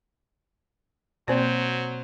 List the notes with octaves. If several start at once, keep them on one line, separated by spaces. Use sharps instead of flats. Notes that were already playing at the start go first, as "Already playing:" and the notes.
B2 F#3 A#3 C4 C5 D5